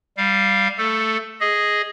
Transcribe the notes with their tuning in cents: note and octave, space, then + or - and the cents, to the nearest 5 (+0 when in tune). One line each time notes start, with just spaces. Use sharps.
G3 +0 F5 +0
A3 +10 A4 +0
G#4 +0 D#5 +0